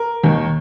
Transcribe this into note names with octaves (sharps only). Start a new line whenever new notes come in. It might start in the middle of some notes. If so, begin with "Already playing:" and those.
Already playing: A#4
D#2 D#3